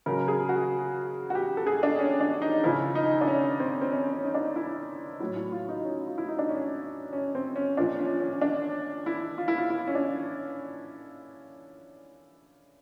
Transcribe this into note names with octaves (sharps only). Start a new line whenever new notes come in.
C#3 F#3 A#4
G#4
F#4
F#4
G4
A4
G#4
D4
C#4
D4
D#4
C#3 F3 E4
D#4
D4
C#4
C4
C4
C#4
C#4
D#4
D4
E4
A2 F#3 E4
E4
F4
D#4
C#4
F4
E4
D#4
D4
C#4
C#4
C4
C#4
A#2 F3 D4
C#4
C#4
D4
E4
F4
E4
F4
E4
C#4
D4